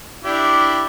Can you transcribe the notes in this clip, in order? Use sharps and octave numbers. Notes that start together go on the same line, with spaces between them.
D4 E4 G4